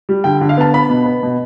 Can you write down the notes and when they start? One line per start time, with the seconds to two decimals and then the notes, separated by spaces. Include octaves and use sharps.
0.09 G3
0.24 D3 G5
0.41 D3
0.49 F5
0.57 B3 A5
0.74 B3 B5
0.89 B2
1.06 B3
1.23 B2